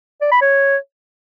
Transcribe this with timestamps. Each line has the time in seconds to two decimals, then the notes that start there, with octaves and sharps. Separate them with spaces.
0.21 D5
0.31 B5
0.41 C#5